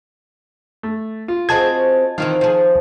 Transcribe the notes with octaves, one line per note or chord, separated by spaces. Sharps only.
A3
F4
C4 F#4 G#4 D#5 A5 G#6
D#3 E3 C4 F4 F6
F3 G#4